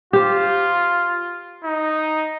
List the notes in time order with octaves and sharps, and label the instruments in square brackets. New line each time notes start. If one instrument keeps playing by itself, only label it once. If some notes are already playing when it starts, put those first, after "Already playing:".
[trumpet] F4 [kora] G4 C5
[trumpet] D#4